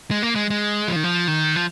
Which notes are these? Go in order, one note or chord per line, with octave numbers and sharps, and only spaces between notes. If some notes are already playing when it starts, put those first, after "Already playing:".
G#3
A#3
G#3
G#3
F3
D#3
F3
D#3
F3